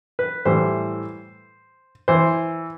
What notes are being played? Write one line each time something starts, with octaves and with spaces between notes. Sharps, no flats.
B4
A2 E3 G3 C5
E3 C5